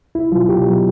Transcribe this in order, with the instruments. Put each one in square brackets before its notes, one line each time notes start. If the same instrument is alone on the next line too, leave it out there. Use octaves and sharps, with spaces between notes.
[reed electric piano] C2 E4
B2 F#3 F4
C2 G4
B2 F#3